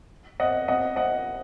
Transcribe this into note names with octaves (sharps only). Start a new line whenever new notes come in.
D#5 F#5
D#5 F#5
D#5 F#5